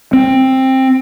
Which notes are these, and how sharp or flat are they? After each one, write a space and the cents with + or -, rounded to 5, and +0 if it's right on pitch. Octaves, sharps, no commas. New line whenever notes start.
C4 +15